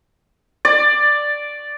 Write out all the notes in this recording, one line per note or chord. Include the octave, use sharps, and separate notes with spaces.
D5